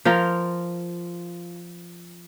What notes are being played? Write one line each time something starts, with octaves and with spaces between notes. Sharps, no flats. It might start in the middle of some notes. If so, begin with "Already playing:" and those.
F3 F4 A#4